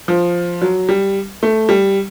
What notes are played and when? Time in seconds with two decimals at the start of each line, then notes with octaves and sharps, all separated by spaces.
0.08 F3
0.62 F#3
0.89 G3
1.43 A3
1.69 G3